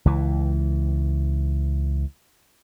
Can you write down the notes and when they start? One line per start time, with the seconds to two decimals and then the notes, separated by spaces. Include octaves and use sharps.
0.05 C#2 E3